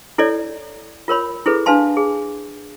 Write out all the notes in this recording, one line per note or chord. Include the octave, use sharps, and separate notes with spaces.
E4 A4 C#5 D5
F4 A#4 C#5 B5
E4 G#4 A4 B4
D4 B4 F5 A5 C6
G#4